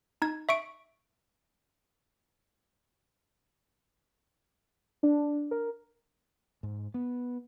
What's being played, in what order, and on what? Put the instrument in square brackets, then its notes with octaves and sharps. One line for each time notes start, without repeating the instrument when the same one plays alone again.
[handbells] D#4 G#6
E5 C#6 D7
[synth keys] D4
A#4
[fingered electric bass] G#2
B3